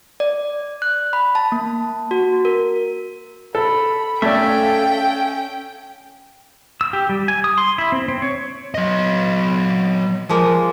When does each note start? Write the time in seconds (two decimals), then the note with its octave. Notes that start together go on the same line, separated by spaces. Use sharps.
0.20 D5
0.82 F#6
1.13 B5
1.35 A5
1.52 A#3
2.11 F#4
2.45 A#4
3.55 A4 B5
4.22 A3 C#4 A4 D5 E5 F5 G5
6.81 E6
6.93 G4
7.09 G3
7.28 G#5
7.44 D#6
7.58 C6
7.78 E4
7.92 C4
8.08 C4
8.22 C#5
8.75 F#3 D#5
10.29 F3 G#3 A#3